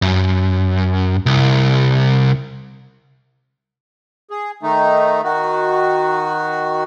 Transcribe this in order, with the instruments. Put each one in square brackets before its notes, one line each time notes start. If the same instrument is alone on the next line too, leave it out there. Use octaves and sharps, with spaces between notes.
[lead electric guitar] F#2
C2
[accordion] G#4
D#3 A3 D#4
D#3 F#4